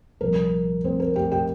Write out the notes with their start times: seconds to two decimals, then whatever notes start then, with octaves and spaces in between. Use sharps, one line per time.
0.21 C2 A#2 F3 A#4
0.84 C4 C5
1.00 A#4
1.16 G4 G5
1.31 G4 G5